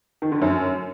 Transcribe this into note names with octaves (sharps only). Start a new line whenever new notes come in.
D#3
D3
F#2